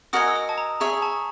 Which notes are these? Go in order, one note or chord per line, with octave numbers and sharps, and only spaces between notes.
F#4 A#4 D#5 G#5 D#6
E6
D#6
A5
A#5
G#4 C#5 E5 A#5
A5